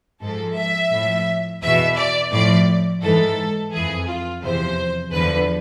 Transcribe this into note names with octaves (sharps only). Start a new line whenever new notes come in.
G#2 F3 A4
E5
A2 F3
E2 B2 E5
D5
A2 F3 D5
G#2 E3 A4
F2 E3 G#4
F4
E2 C3 F3 C5
E2 D3 F3 B4